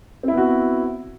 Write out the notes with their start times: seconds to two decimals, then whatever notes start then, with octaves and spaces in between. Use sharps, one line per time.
0.23 C4
0.28 E4
0.33 B3
0.37 F#4